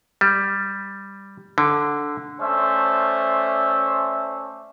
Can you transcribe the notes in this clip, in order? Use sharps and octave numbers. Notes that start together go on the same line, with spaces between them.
G3
D3
A3 C#4 C5 D5 E5